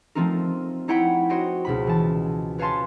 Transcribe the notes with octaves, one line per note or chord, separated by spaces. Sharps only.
F3 A3 C4 D#4 A#4
D#4 E4 C#5 F#5 G5 B5
F#4 C5 C#5 D#5 G5
C#2 B2 B5
E3 A5
B4 C#5 F5 G#5 A5 C6